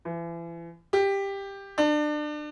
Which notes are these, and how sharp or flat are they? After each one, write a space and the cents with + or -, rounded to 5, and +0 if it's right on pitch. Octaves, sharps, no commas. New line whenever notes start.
E3 +35
G4 +10
D4 +30